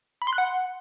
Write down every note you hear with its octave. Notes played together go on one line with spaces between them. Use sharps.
B5
C6
F#6
F#5